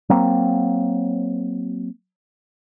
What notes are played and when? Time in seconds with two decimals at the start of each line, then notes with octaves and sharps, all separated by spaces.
0.09 F#3 A#3 C4